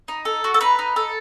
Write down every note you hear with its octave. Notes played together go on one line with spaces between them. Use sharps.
D#4
A4
F#4
A4
D#4 B4
D#4
A4